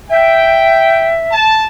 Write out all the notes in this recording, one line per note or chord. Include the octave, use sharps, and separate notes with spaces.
E5 G5
A5